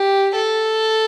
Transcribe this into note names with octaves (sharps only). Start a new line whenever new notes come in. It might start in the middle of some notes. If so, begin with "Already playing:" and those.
Already playing: G4
A4